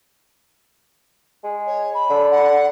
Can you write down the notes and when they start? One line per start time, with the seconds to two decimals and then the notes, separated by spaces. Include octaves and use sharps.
1.44 G#3
1.67 C#5
1.94 B5
2.10 D3
2.31 F#5